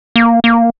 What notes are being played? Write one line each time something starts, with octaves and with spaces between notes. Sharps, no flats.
A#3
A#3